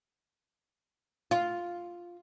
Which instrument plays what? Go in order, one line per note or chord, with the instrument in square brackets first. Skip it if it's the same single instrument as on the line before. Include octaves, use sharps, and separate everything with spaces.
[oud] F4